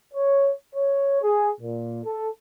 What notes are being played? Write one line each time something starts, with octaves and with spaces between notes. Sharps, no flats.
C#5
C#5
G#4
A#2
A4